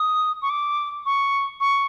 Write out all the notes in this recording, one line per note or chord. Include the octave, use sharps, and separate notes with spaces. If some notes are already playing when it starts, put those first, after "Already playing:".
Already playing: D#6
C#6
D6
C#6
C#6